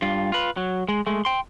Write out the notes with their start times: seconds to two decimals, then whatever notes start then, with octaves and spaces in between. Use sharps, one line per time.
0.02 G2 F4
0.32 F4 B4
0.57 F#3
0.88 G#3
1.07 G#3 A3
1.25 G5 C6